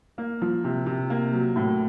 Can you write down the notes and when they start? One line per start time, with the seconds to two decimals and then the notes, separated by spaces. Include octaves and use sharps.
0.18 A#3
0.42 F3
0.64 C3
0.86 C3
1.10 A#3
1.33 F#3
1.56 A2